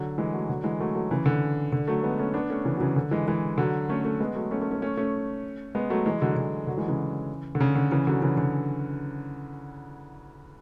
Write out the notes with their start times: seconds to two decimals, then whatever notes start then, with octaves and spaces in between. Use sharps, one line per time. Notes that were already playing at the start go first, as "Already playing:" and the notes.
Already playing: D3 F#3
0.18 E3 G#3
0.33 F#3 A3
0.48 D3 F#3
0.64 E3 G#3
0.80 F#3 A3
0.95 F#3 A3
1.11 C#3 E3
1.26 D3
1.72 D3
1.88 F#3 A3
2.03 G#3 B3
2.19 A3 C#4
2.34 B3 D4
2.50 A3 C#4
2.65 C#3 E3
2.77 F#3
2.81 C#3 E3
2.96 D3
3.11 E3 G#3
3.28 E3 G#3
3.58 D3 F#3
3.89 A3 C#4
4.04 A3 C#4
4.20 G#3 B3
4.35 F#3 A3
4.51 A3 C#4
4.61 A3 C#4
4.71 A3 C#4
4.82 A3 C#4
4.97 A3 C#4
5.75 G#3 B3
5.90 F#3 A3
6.06 E3 G#3
6.21 D3 F#3
6.37 D3
6.67 D3 F#3
6.77 E3 G#3
6.88 C#3 E3
7.55 D3
7.60 C#3
7.76 D3
7.91 C#3 E3
8.07 D3 F#3
8.22 C#3 E3
8.37 D3